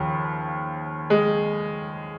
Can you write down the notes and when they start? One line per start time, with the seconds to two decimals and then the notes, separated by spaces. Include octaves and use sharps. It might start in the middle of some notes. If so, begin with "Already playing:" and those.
Already playing: D#2 C#3 F3
1.10 G#3